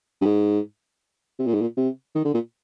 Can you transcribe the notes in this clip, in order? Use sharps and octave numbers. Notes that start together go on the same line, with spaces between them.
G2
G#2
C3
A#2
G#2
A#2
C3
D#3
D3
A#2